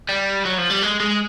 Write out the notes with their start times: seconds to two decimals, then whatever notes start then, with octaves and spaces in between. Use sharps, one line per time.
0.09 G3
0.45 F#3
0.58 F3
0.70 G3
0.82 G#3
1.00 G#3